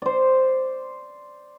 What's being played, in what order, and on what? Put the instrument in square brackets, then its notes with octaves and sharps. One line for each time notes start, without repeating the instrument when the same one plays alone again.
[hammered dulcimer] C5 D5